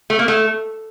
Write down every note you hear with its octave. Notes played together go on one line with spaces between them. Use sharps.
A3
A#3
A3